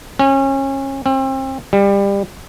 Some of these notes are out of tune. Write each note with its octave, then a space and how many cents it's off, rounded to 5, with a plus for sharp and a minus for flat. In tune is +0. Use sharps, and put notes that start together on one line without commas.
C#4 -30
C4 +35
G3 +25